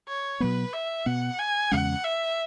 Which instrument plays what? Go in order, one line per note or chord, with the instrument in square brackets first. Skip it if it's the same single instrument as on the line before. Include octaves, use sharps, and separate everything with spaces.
[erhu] C#5
[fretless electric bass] B2 F#3 B3 [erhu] B4
[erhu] E5
[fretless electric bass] B2 B3 [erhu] F#5
[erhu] G#5
[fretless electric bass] E2 C#3 G#3 C#4 [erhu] F#5
[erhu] E5